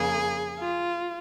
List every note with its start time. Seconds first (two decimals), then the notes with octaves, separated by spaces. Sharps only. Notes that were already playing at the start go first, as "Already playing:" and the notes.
Already playing: F2 C#3 A#3 G#4
0.60 F4